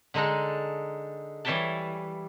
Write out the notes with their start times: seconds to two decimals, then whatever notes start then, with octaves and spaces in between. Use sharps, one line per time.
0.14 D3 G#3 D#4 A4 A#5
1.45 E3 G3 C#5 E5 G5 A5